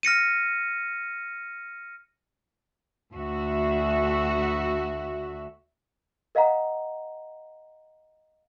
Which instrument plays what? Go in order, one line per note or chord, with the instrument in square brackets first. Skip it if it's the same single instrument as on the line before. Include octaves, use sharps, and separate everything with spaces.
[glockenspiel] F6 A#6 C#7 D#7
[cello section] D2 F#4 E5
[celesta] A#4 D#5 F5 F#5 A#5